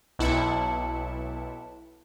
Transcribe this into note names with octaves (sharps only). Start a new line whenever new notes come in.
B1 E4 A5 C#7